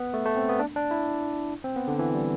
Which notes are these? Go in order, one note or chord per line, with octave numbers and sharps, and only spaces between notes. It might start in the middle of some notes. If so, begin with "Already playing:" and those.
Already playing: B3
A3
A3
C4
B3
D4
D4
E4
C4
B3
D3
E3
G3